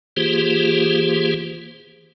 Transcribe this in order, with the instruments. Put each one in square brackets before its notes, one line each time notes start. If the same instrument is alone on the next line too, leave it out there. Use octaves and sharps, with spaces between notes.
[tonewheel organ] E3 A#3 F4 G4 G#4 C5